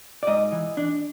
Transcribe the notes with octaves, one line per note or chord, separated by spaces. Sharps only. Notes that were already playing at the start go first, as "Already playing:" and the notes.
D5
G#2 D#5
E3
D4